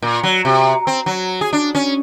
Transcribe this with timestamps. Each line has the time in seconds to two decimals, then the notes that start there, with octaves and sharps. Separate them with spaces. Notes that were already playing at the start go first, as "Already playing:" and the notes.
0.02 A#2
0.23 F#3
0.45 C3
0.87 C4
1.06 F#3
1.41 G#4
1.53 D4
1.75 C#4